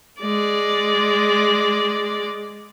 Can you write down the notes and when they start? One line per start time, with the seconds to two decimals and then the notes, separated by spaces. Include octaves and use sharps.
0.22 G#3 D5